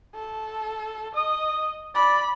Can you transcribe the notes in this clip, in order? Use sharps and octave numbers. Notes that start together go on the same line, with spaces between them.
A4
D#5 D#6
D5 B5